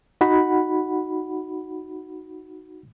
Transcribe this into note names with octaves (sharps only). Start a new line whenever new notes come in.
D#4 F#4 F#5 B5